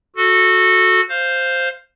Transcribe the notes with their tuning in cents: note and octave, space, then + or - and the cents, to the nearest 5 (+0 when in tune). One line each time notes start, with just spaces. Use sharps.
F#4 -15 A4 +0
C5 +0 F5 +0